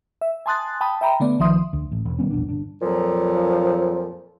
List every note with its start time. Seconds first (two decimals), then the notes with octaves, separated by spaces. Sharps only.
0.21 E5
0.46 G#5 A5 C6 D#6 F#6 A6
0.81 G5 A5 B5 D#6
1.01 E5 G5 A#5 B5
1.20 D3 A3 B3 D5
1.39 A#1 D#3 F3 E5 C6 D#6
1.73 D2
1.92 A1
2.05 E1
2.19 D#3 G3 B3 C#4
2.31 A#1 E2 B2 D4
2.49 G1 D4
2.82 F2 A#2 F3 F#3